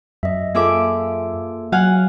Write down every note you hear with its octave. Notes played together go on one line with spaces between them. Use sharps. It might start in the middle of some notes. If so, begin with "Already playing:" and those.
F#2 D#5 E5
A#3 F4 G#4 A4 E5 D6
F#3 F5 F#5 G#5